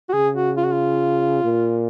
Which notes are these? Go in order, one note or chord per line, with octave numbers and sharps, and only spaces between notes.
F#4
C#3 G#4
F#4
F4
F#4
F4
A#2